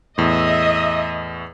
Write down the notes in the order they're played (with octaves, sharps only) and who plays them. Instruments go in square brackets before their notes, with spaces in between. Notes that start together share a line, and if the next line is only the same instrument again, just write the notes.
[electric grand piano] E2 A2 [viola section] D#5 E5